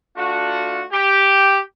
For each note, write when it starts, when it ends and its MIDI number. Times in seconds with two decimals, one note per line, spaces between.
0.17 0.82 57
0.17 0.82 62
0.17 0.82 65
0.17 0.82 66
0.92 1.58 67